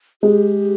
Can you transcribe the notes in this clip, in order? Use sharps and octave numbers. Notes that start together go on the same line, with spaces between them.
G#3 G4